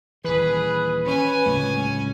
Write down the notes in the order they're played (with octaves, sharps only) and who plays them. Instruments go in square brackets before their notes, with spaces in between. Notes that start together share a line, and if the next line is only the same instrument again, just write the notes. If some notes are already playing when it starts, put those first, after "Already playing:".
[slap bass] D#1 E3 [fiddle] G#4 [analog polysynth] B4
[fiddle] C#4 G#5
[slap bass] D1 C#2 A3